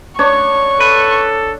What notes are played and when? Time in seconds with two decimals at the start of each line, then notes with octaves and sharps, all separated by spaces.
0.19 D4 C#5 C#6
0.80 A4 B4